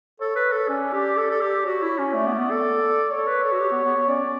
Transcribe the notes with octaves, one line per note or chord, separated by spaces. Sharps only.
A4 C#5
B4
A4
C#4 D5
G4
A4
A4
G4
F#4 C#5
E4
C#4
A3 D5
B3
A3
B3
A4
A4 C#5
B4
A4
F#4
G4
B3
B3
B3
C#4 D5